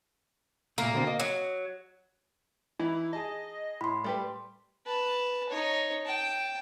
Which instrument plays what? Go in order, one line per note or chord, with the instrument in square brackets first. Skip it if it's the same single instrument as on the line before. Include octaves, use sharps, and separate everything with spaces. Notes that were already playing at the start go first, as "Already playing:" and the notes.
[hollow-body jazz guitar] A#2 A3 [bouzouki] A#3
[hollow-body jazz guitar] B2 D3 C4
D#5
[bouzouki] F#3
[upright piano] E3 [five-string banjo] D#4 [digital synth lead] E4
[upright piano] G#4 A5 [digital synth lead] D#5
[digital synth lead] A2 [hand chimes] B5 C6
[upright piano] G3 [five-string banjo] A3 G4 B4
[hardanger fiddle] B4 A5
D#4 C#5
G5 A5